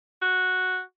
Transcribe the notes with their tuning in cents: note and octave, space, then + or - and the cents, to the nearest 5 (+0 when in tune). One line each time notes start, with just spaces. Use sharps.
F#4 -5